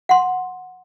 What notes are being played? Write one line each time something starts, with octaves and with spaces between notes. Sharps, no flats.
F#5 C6